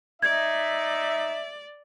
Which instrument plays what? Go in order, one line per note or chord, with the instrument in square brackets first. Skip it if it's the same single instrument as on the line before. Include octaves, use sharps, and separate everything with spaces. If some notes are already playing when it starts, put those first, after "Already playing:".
[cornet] D#4 [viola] D5 [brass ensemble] E5 [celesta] G#6